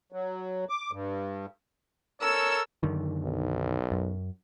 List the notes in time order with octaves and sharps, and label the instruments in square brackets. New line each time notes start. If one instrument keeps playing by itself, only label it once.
[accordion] F#3
D6
G2
[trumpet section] A4 A#4 C#5 [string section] E6
[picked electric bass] F#2 D3 D#3
[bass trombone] B1
[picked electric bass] F#2